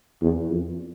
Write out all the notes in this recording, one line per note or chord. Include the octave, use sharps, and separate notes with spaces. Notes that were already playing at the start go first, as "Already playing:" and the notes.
E2
F2